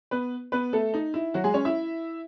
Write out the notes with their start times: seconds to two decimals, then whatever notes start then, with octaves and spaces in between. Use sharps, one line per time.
0.11 B3 B4
0.52 B3 B4
0.73 A3 A4
0.94 D#4
1.14 E4
1.34 F#3 F#4
1.44 G#3 G#4
1.54 C#4 C#5
1.65 E4 E5